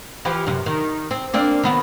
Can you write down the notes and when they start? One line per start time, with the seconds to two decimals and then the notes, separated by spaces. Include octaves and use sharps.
0.25 E3 F3 G4
0.47 F#2 C3
0.66 D#3
1.11 C4
1.34 A#3 C4 D4
1.63 D#3 B3 F#4